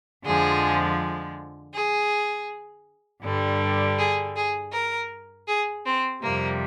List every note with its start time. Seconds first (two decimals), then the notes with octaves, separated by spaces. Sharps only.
0.24 F2 D3 F3 G#3 G#4
1.73 G#4
3.22 G2 D3 G3
3.98 G#4
4.35 G#4
4.72 A#4
5.47 G#4
5.85 C4
6.22 F2 C3 G3 A#3